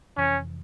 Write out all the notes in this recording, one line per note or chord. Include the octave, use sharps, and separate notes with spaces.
F2 C3 E3 C#4